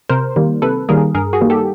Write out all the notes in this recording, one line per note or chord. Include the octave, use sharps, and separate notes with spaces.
C3 A#4 C5
D#3 G3 A#3
C3 A4 B4
D#3 G3 A#3 G#4 A#4
G2 G#4 A#4
F#4 G#4
D#3 G3 A#3
G4 A4